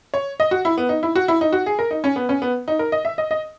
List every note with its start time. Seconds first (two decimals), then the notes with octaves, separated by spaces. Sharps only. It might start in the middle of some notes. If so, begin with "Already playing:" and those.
0.14 C#5
0.40 D#5
0.51 F#4
0.65 E4
0.78 B3
0.89 D#4
1.03 E4
1.16 F#4
1.28 E4
1.41 D#4
1.53 F#4
1.66 G#4
1.79 A#4
1.91 D#4
2.04 C#4
2.16 B3
2.29 C#4
2.42 B3
2.68 D#4
2.79 A#4
2.92 D#5
3.05 E5
3.18 D#5
3.31 D#5